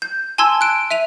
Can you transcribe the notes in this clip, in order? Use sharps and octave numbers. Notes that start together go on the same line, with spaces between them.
G6
G#5 A5 C6 E6 G#6
F#6 D7
E5 D#7 F7